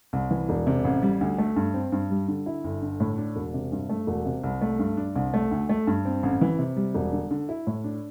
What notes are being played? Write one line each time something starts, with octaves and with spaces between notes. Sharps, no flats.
C2
E3
E1
C3
A1
G3
D2
A3
G2
C4
G2
G3
D3
E4
G1
D3
A2
D4
E1
C3
G2
A3
E1
C3
C2
A3
G2
D4
C2
A3
D2
A3
G2
C4
A1
E3
C3
G3
E1
D3
D3
E4
A2
D4